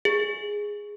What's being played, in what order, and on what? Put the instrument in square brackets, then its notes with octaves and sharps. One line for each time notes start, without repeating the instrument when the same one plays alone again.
[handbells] G#4